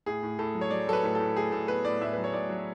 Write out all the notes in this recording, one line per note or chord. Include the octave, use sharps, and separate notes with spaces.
A2 G#4
A2
A2 A4
F#3
C#5
F#3 D5
F#3 A4
B4
A2 B4
A2 A4
A2 G#4
A2 A4
B3 B4
A2 D5
A2 E5
F#3 B4
C#5
A2 D5
F#3